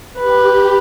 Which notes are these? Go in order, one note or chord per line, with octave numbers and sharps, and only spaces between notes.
G4 B4